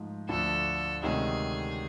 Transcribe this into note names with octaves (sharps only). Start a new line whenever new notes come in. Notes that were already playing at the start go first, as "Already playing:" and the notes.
Already playing: G#2 F3 A3
D2 D3 F3 A3 D4 A4
D2 C3 D#3 G#3 C#4 G#4